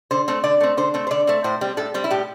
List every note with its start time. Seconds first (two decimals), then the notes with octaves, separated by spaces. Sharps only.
0.11 D3 C5
0.28 A3 C4
0.44 D3 D5
0.60 A3 C4
0.77 D3 C5
0.94 A3 C4
1.07 C5
1.11 D3 D5
1.27 A3 C4
1.44 A2 C5
1.61 G3 C4
1.77 A2 A4
1.94 G3 C4
2.04 E4
2.11 A2 G4